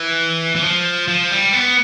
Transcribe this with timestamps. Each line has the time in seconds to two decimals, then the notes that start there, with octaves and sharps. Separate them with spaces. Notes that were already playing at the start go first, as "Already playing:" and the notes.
Already playing: E3
0.56 E3
0.63 F3
1.08 F3
1.31 G3
1.53 B3